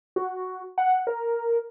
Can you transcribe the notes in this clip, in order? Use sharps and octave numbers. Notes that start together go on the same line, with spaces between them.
F#4
F#5
A#4